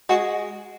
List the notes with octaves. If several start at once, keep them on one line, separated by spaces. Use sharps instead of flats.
G#3 F#4